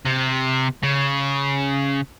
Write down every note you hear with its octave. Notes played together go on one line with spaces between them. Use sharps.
C3
C#3